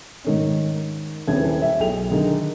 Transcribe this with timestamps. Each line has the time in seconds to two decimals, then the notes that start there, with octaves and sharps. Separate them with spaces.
0.24 G#2 D#3 C#4
1.27 D#1 C#3 E4 B4 G#6
1.62 E5 G5
1.80 B1 G#4 A4 G5 F7
2.11 D3 D#3 D#4 G#4 A#4